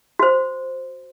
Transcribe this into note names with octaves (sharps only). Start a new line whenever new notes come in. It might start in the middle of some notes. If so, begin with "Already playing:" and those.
F#4 C5